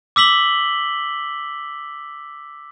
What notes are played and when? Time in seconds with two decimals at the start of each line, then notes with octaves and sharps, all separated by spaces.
0.16 D6 E6 B6 F#7 G7